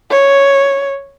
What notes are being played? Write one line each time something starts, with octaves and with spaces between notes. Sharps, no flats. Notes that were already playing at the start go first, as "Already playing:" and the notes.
C#5